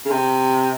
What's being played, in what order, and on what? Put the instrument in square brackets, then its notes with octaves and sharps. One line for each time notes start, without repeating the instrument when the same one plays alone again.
[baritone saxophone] C#3
C3